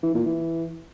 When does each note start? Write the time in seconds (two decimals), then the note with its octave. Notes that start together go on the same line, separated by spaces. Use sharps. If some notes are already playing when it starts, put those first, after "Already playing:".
0.03 E3
0.14 A#2
0.26 E3